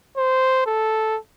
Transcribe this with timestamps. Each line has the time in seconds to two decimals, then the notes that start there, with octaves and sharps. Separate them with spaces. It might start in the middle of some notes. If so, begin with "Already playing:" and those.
0.17 C5
0.66 A4